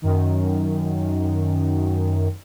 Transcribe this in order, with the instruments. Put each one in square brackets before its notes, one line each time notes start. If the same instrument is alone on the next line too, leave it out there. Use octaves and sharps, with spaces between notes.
[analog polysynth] F#2 D#3